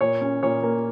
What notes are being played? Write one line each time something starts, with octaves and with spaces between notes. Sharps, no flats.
A#2 C#5
C#4
A#2 C#5
A#3